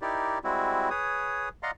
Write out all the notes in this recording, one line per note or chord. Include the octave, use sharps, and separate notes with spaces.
D#4 E4 G4 A#4 D5
G3 G#3 C4 E4 F#4
G#4 B4 C#5 D#6
D5 D#5 F5 F#5 A#5 C6